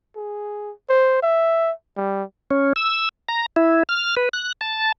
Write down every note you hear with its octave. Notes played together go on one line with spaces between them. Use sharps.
G#4
C5
E5
G3
C#4
E6
A#5
E4
F6
B4
F#6
A5